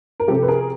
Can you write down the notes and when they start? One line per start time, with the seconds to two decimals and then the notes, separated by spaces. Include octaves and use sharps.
0.20 A#4
0.28 C3 F3 G4 A4
0.43 B4
0.48 G#4 A#4